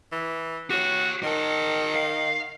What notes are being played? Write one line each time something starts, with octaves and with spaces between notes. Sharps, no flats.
E3
F#4 G4 C#5
D#3 A#4 A5
F5